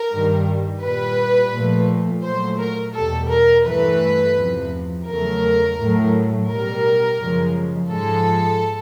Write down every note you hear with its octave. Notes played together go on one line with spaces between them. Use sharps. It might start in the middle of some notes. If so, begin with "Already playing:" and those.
Already playing: A#4
G2 D#3 G3
A#2 G3 B4
A#2 F3 A3
A#2 F#3 A3 C5
A#4
E2 B2 G3 A4
A#4
G2 E3 A3 B4
E2 C3 F3
E2 C#3 F#3 A3 A#4
A2 F#3 A3
B2 G3 A#4
F#2 C#3 F3 G#3
G#2 F3 G#3 A4